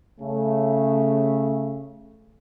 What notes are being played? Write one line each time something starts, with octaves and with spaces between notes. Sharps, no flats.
C#3 A3